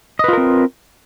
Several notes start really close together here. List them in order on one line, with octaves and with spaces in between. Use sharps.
D#5 B4 F4 A#4 C4